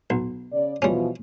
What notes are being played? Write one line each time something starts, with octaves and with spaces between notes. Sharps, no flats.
B1
C#3 D5
B2 E3 F3 G3 C#4